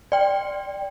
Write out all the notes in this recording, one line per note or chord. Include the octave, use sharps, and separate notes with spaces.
D5 G5